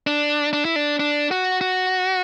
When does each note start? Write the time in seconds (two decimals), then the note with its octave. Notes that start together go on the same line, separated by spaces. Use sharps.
0.07 D4
0.53 D4
0.65 E4
0.76 D4
1.00 D4
1.31 F#4
1.61 F#4